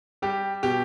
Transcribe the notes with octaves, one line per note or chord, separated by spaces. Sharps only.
G3 G4
B2 G4